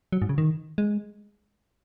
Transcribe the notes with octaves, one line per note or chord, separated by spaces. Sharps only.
F#3
G#2
C#3
D#3
G#3